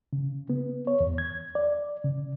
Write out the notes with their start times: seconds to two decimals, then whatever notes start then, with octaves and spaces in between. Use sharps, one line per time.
0.13 C#3
0.50 B3
0.87 C#5
1.00 E2
1.18 G#6
1.55 D5
2.05 C#3